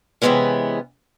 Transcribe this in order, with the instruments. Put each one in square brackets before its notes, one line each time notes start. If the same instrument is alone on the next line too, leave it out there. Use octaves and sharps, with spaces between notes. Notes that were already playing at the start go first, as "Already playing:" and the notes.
[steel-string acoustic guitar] C3 E3 F3 G#3 B3 C#4